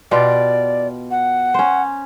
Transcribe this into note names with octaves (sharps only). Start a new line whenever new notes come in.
B2 F4 G4 D5
F#5
C#4 C5